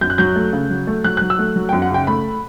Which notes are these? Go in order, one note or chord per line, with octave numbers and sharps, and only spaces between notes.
F#2 G6
F#6
F#3 G6
A3
C#3
F#3
A3
F#3 F#6
F#6
F#3
E6
A3
F#3
G5
F#2
F#5
C#3 G5
A3 B5